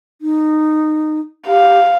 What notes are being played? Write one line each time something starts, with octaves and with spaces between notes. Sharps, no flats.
D#4
G4 F5